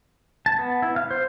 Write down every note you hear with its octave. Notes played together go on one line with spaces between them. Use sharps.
A5
B3
E4
F5
C5